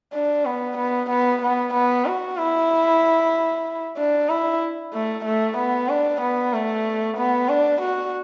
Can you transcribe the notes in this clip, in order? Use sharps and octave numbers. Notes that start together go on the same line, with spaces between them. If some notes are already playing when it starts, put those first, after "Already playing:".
D4
B3
B3
B3
B3
B3
F#4
E4
D4
E4
A3
A3
B3
D4
B3
A3
B3
D4
F#4